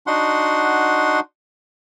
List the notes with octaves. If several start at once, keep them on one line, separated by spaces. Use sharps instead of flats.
D4 D#4 F#4 F#5 C6